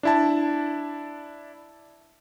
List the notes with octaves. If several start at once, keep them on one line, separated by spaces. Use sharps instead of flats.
D4 E4 A5